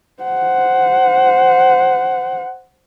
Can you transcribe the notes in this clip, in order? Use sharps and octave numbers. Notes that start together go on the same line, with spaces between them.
C5 F#5